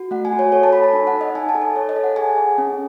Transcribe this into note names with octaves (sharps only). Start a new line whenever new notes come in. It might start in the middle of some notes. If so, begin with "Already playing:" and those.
Already playing: F#4
A3 F#5
G#5
F#4
C#5
A4 C#5
A5
A4 B5
A5
D#4
F#5
D#4
D#5
D#4 G#5
A5
A4
A5
A4 C#5
D#5
A4
F#5
G#4 G#5
G#4
C#4